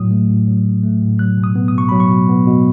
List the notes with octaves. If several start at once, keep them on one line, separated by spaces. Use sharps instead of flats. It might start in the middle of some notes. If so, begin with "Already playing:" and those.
Already playing: A2 F#3 D#6
A3
A2
F#3
A2
A3
A2
F#3 F#6
B2
D#6
B3
D#6
B2 C#6
F#3 B5
C#6
B2
B3
B2